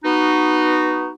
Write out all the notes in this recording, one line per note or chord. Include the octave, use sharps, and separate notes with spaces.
B3 D#4 F#4